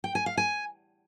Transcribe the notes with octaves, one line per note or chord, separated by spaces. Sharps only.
G5
G#5
F5
G#5